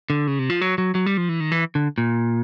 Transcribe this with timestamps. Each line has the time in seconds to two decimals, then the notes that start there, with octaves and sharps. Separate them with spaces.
0.10 D3
0.27 C#3
0.39 C3
0.50 F3
0.61 F#3
0.78 F#3
0.95 F#3
1.06 G3
1.17 F3
1.29 E3
1.40 D#3
1.52 E3
1.75 D3
1.98 A#2